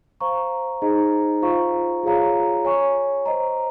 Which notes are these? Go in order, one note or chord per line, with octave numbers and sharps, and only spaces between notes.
C5 F5 A#5 C#6
D#4 G#4 C5 D#5 A#5
F4 C5 F5 A#5 C#6
F4 G#4 C#5 F5 A#5
C#5 G#5 C#6
C5 D#5 A#5